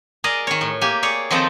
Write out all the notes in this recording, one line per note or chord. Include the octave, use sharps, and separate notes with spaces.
G#4 A#4 D5 D#5
D#3 C#5
A2
A#3 G4 G#5
G#4 C#5 D5
D#3 F3 C4 D#4 A4